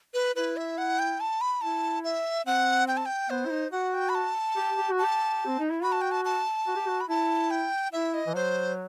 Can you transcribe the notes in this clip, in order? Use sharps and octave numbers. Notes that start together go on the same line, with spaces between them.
B4
E4 B4
E5
F#5
G5
A5
B5
E4 A5
E5
C4 F#5
G5
A5
G5
B3 C5
E4
D#4
F#4 F#5
G5
B5
A5
G4
G4
F#4
G4 A5
C4
D#4
E4
F#4 B5
A5
G5
A5
A5
F#4
G4
F#4
B5
E4 A5
G5
E4 E5
D#5
E3
F#3 C5